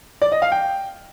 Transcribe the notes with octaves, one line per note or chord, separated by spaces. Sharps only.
D5
D#5
F5
G5